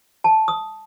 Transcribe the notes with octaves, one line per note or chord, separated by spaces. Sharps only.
A5
D#6